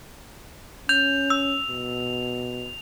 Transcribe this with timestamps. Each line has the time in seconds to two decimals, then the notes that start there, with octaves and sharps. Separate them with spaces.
0.89 C#4 G6 F7
1.30 E6
1.68 B2